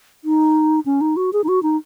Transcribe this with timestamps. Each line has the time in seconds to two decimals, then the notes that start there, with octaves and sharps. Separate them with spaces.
0.25 D#4
0.86 C#4
1.01 D#4
1.16 F#4
1.33 G#4
1.44 D#4
1.48 F#4
1.63 D#4